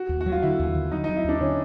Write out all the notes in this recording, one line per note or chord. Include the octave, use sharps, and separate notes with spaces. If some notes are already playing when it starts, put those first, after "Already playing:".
Already playing: F#4
D#2
F#4
F#3
F4
D3 E4
D#2
D3
F#3 D#4
F#3 D#4
E4
D#2 D4
D3 C#4